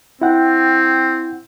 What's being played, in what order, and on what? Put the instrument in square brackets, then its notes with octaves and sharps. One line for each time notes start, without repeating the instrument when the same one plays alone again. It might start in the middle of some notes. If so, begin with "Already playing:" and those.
[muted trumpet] C4 [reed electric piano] E4 F#5 G5